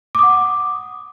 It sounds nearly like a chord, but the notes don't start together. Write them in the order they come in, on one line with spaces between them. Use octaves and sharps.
D6 D#6 F#5